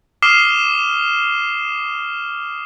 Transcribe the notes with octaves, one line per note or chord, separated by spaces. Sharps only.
D6 D#6 F6 C7 E7 G7